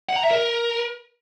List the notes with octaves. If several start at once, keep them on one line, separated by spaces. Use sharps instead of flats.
F#5
A#5
E5
A#4